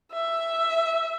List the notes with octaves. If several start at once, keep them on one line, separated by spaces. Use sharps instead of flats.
E5